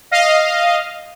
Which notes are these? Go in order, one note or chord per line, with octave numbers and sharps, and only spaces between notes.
D#5 F5